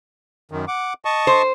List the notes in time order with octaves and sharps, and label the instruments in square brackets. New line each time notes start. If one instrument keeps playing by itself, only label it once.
[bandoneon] F#2 D#3
F#5 D6
D#5 A5 C#6
[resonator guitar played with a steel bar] C5